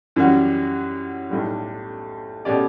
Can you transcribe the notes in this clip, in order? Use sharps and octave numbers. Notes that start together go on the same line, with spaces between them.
F#2 E3 G3 C#4 F#4
B1 A2 G3
B2 A3 C#4 G4 D5